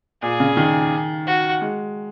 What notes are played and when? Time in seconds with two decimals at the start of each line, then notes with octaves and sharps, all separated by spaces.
0.22 A#2 G#4
0.40 C#3
0.57 D#3
1.27 F#4
1.61 G#3